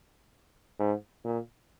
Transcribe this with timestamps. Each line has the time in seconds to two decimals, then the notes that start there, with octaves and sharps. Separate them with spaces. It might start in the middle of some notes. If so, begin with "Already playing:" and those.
0.79 G#2
1.24 A#2